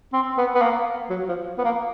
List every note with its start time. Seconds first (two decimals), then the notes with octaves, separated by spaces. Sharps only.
0.13 C4
0.37 B3
0.55 B3
0.62 A#3
1.10 F#3
1.28 F3
1.58 B3
1.64 A#3